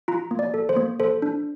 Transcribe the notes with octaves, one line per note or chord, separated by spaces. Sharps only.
F4 A#5
A#3
D5
A4
C5
A#3
A4 C5
D4